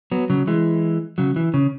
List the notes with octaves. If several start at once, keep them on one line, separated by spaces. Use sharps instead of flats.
F#3 B3
C#3 F#3
E3 G#3
C#3 F#3
E3
C#3